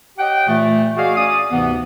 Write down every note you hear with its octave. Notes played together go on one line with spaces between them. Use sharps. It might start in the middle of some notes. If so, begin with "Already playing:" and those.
G4 C#5 D#5 F#5 G5
A#2 E3 A3
F#4 G#4 D5 D#5 F5
C#4 D5 D#6
D2 G#2 C3 E3 B3